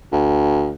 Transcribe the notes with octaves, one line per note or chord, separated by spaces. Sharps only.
D2